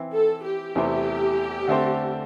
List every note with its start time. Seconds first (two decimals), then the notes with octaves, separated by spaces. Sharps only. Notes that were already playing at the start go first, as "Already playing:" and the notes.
Already playing: E3 C4 E4
0.14 A4
0.45 G4
0.75 E2 C3 A3 E4 C5
1.67 D3 A3 C4 A4 C5